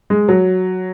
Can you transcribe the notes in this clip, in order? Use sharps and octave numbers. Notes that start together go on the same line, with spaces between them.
G#3
F#3